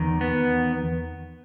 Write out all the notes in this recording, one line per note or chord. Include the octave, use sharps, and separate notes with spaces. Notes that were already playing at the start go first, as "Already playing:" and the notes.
Already playing: E2 D#3
B3